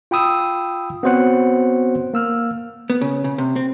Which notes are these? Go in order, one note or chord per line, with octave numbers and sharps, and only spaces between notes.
F4 G5 B5 D#6 E6
B3 C4 F#4 C5 C#5 F#5
A#3 E6 F6
B3
C#3
C#3
C3
C4